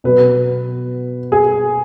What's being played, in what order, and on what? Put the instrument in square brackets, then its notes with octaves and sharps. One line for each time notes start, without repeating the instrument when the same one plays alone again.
[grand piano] B2 F#3 B3 B4
G#4